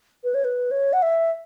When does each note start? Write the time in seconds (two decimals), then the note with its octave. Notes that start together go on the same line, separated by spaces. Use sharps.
0.24 B4
0.34 C#5
0.44 B4
0.71 C#5
0.93 F#5
1.02 E5